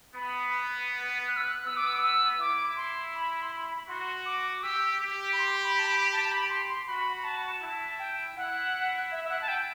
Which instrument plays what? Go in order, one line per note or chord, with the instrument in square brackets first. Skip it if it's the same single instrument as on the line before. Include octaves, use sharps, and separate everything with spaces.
[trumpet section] B3 [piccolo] B5
[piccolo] F#6
E6
F#6
[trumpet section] B3 [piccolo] E6
[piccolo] D6
E6
E6
[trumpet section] E4 [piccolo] D6
[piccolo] C6
B5
C6
B5
[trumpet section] F#4 [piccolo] C6
[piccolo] D6
D6
[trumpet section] G4 [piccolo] E6
[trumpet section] G4
[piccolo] B5
C6
B5
A5
B5
A5
A5
B5
C6
C6
[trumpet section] F#4 [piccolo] B5
[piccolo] B5
A5
[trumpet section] E4 [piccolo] A5
[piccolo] G5
[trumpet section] E4 [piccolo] F#5
[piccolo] E5
E5
F#5
A5
G5